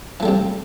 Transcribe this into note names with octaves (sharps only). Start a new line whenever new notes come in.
C3 E3 G3 A3